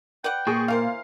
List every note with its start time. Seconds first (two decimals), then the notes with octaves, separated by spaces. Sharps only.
0.24 B4 D5 F#5 G5
0.47 A#2 G#4 C#6
0.68 E3 A#4 C5 F5